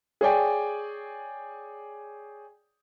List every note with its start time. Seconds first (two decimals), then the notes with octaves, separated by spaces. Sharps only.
0.21 G#4 C#5 D5 G5 G#5